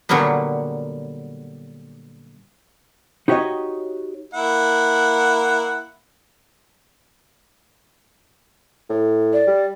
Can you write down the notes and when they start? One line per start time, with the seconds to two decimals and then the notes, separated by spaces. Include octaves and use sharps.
0.09 A#2 D3 F#3 G3 A#3 B3
3.28 D#4 F#4 G4 B4 C#5 D#5
4.34 A#3 E4 F#5
8.89 A2
9.33 D5
9.47 G3